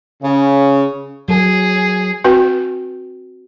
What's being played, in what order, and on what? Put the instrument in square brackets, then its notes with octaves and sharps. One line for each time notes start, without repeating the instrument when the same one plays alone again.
[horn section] C#3
[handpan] F#3 [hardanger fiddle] G#4
[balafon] C4 F#4 B4 G5 G#5